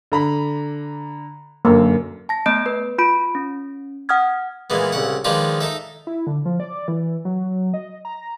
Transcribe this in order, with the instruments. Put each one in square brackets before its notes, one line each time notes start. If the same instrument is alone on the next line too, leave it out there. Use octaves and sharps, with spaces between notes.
[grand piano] D3 A#5 B5
[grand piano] F#2 D3 [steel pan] A#3
[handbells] A5 A#6
A3 B3 D#5 G6 D7
B4
F4 B5 D7
C#4
F#5 D#6 F6 G#6
[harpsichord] A#2 E3 G#3 B3
C2 C#3 F#5
D#3 F3 G#3 D4 F4 B4
D#4 A4 E5
[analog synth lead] E4
D3
F3
D5
E3
F#3
D#5
A#5